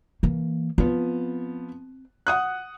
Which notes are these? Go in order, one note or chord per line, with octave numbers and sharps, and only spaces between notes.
E3 A#3
F3 B3 C4
F#5 D#6 F#6